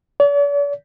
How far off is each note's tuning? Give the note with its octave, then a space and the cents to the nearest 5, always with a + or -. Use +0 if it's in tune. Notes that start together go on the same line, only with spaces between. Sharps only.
D5 -45